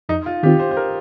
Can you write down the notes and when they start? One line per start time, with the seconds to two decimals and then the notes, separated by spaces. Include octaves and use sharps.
0.09 F2 D#4
0.26 F4
0.43 D#3 C4 F4 G4
0.60 C5
0.71 C5
0.77 A#4